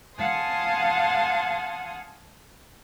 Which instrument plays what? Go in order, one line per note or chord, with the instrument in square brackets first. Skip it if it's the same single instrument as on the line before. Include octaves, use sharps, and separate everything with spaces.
[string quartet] F5 F#5 G#5 A5 C6 D#6